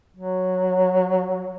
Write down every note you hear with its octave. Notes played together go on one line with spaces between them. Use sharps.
F#3